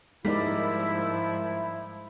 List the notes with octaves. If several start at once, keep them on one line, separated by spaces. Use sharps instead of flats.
G#2 F3 G3 G#3 A#3 D#4 E4 D5